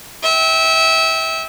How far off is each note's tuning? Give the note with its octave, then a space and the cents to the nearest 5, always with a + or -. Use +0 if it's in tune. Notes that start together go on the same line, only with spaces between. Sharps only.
E5 -25 G5 +0